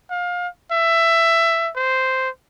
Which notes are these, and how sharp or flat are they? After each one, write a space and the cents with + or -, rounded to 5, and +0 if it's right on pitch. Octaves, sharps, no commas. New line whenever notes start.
F5 +25
E5 +15
C5 -5